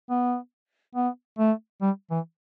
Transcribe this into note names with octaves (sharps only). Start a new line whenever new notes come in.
B3
B3
A3
G3
E3